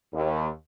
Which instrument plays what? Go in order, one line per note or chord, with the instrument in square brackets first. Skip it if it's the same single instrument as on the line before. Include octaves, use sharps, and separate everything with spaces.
[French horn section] D#2